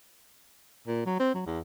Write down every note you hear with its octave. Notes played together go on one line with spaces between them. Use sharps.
A#2
F#3
C4
F#3
E2